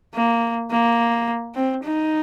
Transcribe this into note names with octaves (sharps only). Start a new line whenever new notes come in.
A#3
A#3
C4
D#4